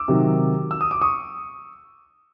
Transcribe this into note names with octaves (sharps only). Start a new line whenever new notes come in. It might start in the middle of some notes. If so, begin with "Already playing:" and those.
Already playing: D6 E6
C3 D#3 F#3
E6
D#6
D6
C#6 D#6